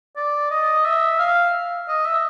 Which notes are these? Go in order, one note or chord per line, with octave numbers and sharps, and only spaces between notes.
D5
D#5
E5
F5
D#5
E5